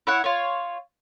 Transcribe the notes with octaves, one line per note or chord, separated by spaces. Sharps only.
E4 C#5 F#5
F4 C#5